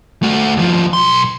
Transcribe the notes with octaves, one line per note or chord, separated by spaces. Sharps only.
A3 F#4
D#2 F3
B1 C6